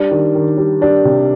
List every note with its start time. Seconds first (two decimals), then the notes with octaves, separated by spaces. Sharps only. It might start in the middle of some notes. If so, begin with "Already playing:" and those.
Already playing: G3 D4
0.11 D#3
0.35 D#3
0.58 G3
0.81 G3 D4
1.05 C3